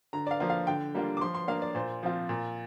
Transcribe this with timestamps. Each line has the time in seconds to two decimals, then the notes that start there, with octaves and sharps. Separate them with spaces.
0.13 D3 A#5
0.27 D5
0.31 F5
0.40 F3 A#3 F4
0.50 F5
0.67 D3 G5
0.95 G3 A#3 D4 F4
1.17 D6
1.21 F3 C6
1.35 C6
1.48 A#3 D4 F5
1.62 D5
1.75 A#2 C5
2.03 F3 C4 F4
2.29 A#2